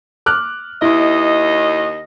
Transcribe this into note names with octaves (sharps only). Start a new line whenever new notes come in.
D6 F6 F#6
D#2 E4 D#5